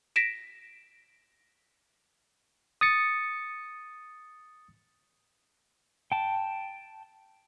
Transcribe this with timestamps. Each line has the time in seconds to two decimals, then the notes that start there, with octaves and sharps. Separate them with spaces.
0.16 A#6 B6 D7 E7
2.81 D#6 A6 C#7
6.12 G5 A5